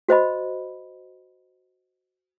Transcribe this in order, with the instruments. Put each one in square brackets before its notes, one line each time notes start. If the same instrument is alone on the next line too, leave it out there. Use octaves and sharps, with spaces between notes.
[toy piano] F#4 C5 D#5 B5